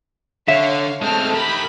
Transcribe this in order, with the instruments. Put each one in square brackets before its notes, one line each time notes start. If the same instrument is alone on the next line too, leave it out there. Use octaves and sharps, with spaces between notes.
[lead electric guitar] D3 [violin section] C#5 F5 [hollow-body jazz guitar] E5
[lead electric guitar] G#3 C4 [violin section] A3 A4 F6
[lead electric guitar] G4 A#4 [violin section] B5